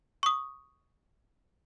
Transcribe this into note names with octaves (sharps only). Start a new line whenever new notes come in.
C#6 D#6